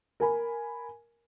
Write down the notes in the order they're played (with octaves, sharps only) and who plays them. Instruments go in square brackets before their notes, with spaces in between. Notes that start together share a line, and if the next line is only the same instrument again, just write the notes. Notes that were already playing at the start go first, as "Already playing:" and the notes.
[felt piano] A#4 G#5 B5